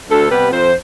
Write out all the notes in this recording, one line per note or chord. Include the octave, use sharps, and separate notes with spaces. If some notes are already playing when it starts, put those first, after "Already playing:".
D2 A4
C3 G3 B3 B4
F2 C5